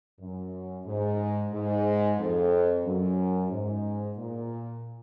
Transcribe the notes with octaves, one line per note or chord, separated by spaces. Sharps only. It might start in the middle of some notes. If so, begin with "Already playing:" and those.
F#2
G#2
G#2
F2
F#2
G#2
A#2